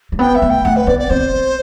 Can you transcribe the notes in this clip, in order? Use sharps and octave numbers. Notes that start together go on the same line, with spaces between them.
A3
B3 G5
E5
A3
G5
A3 F#5
B4
B3 D5
D5
C4 C5